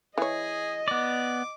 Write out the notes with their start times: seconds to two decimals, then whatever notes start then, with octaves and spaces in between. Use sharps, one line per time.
0.18 E3 G#4 C#5 D#5
0.88 B3 D5 D6